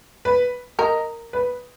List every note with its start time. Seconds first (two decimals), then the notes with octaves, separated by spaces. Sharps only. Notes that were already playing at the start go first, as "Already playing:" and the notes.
0.25 B4
0.79 A#4 D#5
1.33 B4